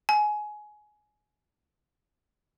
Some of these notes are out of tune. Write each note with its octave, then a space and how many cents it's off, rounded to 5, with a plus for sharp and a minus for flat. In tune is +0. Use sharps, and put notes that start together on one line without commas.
G#5 +20